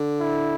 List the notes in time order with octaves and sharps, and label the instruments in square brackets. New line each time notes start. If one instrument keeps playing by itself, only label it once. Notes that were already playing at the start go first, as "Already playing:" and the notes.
Already playing: [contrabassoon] D3
[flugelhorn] E4